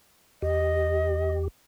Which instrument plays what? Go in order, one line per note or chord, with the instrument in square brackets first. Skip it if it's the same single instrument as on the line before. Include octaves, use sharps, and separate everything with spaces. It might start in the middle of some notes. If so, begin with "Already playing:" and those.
[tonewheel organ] E2 G4 [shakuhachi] D#5